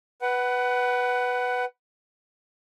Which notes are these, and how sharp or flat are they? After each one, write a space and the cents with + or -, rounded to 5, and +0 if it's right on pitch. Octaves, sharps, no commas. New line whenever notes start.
B4 +0 F#5 +20